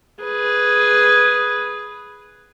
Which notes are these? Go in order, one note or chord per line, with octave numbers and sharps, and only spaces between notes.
G#4 B4